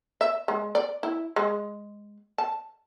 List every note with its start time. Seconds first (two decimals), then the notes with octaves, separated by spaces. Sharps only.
0.21 E5
0.48 G#3
0.75 D5
1.03 E4
1.36 G#3
2.38 A5